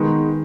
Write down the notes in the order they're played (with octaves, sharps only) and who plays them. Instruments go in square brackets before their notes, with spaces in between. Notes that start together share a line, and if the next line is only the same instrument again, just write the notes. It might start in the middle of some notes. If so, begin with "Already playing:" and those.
Already playing: [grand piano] D#3 [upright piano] G#3 B3 D#4